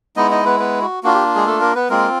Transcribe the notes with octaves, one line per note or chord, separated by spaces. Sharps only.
G#3 B3 D#4 E4 D#5
D#4 D#5
B3 B4
B3 B4
F#4
A#3 D4 F4 F#4
G4
G#3 G#4
A3 A4
A#3 A#4
B3 B4
G#3 A#3 C4 F4 A#4